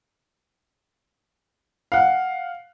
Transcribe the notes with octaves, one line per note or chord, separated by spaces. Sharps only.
F5 F#5